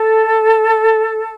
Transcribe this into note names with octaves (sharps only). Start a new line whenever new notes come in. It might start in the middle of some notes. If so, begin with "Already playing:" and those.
Already playing: A4